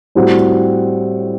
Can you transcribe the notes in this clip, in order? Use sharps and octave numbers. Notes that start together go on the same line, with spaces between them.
A2 G3 C4 F#4